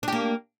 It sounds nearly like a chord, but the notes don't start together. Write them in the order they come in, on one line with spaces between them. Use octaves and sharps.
D4 G4 A#3